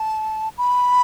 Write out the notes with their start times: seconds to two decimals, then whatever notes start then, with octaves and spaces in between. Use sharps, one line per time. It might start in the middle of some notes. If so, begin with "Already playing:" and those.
Already playing: A5
0.58 B5